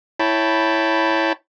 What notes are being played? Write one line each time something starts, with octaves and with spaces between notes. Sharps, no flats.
E4 C#5 G5 A5 B5